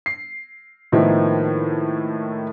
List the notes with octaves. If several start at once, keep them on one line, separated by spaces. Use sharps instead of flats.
C7
A2 D#3 F3 A#3 B3 E4